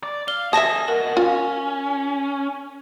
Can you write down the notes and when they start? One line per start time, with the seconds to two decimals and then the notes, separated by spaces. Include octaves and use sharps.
0.03 D5
0.28 F5 G7
0.53 A4 E5 G#5 A5 D#6 A#6 E7
0.88 F#4 A#4 D#5
1.17 C#4 F4